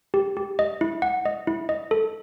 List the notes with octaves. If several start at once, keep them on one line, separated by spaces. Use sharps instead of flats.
G4
G4
D#5
E4
F#5
D#5
E4
D#5
A4